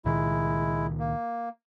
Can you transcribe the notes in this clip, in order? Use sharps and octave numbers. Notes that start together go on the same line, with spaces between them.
C#2 A#2 D#3 G#3 E4
A#3